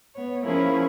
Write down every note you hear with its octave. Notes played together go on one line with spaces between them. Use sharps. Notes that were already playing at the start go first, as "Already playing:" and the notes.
B3 C#5
F3 A#3 C#4 E4 G#4 A#4